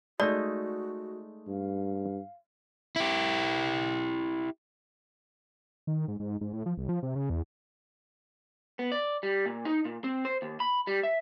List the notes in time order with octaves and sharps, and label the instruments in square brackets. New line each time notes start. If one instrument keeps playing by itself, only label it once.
[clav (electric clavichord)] G#3 A3 D#4 [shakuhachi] F#4 [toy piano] D5
[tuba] G2 [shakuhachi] F5
[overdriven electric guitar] E4 G4
[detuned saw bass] D#3
G#2
G#2
G#2
A2
F3
C2
F3
C3
C#3
E2
[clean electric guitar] B3
D5
G3
A#2
D#4
A#2
C4
C5
D#2
B5
G3
E5